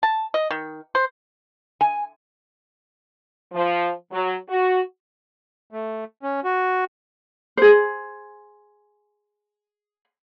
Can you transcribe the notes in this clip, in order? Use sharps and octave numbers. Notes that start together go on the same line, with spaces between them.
A5
D#5
D#3
C5
G#5
F3
F#3
F#4
A3
C#4
F#4
G#4 C5